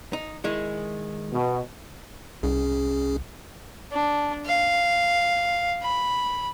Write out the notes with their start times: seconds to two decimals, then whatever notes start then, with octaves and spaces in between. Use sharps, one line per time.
0.13 D#4
0.44 D#3 G#3 E4
1.32 B2
2.43 C2 C#4 G#4
3.92 D4
4.46 F5
5.82 B5